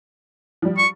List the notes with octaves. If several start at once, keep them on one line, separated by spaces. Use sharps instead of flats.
F3 G3
C#6